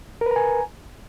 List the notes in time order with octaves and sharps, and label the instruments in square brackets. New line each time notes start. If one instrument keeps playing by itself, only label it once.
[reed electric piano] A#4
B4
A#5
G#5